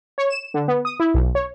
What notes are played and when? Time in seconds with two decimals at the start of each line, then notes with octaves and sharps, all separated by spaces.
0.18 C#5
0.30 E7
0.54 D3
0.68 B3
0.85 D#6
1.00 E4
1.14 B1
1.35 C#5